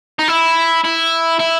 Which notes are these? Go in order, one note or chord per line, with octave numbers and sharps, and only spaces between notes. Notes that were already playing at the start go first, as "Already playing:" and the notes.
D#4
E4
E4
E4